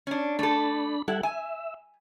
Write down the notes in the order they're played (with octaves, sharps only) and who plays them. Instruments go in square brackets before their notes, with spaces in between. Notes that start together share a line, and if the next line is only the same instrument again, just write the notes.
[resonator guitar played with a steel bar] C#4 D4
[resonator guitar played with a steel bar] A3 A4 [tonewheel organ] D4 B5
[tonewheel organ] G3 A4 F#5 [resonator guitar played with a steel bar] E4
[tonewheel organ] E5 [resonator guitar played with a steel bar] G#5